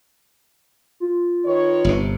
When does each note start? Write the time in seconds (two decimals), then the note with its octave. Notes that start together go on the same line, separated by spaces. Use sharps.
1.00 F4
1.45 D#3 B4 C#5
1.84 G1 C3